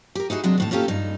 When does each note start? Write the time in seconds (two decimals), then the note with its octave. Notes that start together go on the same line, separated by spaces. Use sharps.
0.15 G4 A#4
0.30 D#4 E4 F#4 G#4
0.44 C3 F#3 G#3 D4
0.58 D#2 A2 A5
0.71 A#3 C#4 F4 G4 A4
0.88 G2 D#4